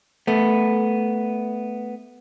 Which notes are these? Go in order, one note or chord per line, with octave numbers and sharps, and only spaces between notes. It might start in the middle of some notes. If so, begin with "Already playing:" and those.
A3 B3